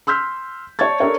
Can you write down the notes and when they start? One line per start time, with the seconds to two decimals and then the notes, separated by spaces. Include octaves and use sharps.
0.07 C6 E6 F6 G6 B6
0.79 C#5 D5 A5 C#6 G#6 A6
1.00 D4 A4 A#4 C#5